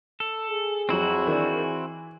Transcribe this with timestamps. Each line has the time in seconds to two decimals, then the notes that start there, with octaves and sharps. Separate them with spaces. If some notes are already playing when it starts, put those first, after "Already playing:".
0.20 A4
0.50 G#4
0.89 F2 F#3 C4 E4 F#4
1.27 D#3 E3 D4
1.61 E3